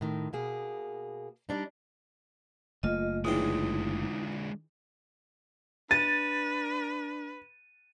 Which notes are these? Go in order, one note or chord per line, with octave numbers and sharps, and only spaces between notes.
A2 D#3
B2 A#3 G#4
G3 D4 D#4
F#1 A3 A#3 F4 D#5
C#2 D3 E3 G#3 D#4 G5
D4 B4 A6 D#7